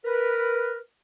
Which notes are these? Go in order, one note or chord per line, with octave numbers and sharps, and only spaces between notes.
A#4 B4